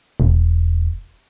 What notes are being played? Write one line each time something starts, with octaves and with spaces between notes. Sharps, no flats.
E1